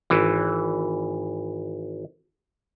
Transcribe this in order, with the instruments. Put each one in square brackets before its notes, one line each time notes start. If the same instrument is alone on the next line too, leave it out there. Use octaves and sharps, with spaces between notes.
[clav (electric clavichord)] G#1 E3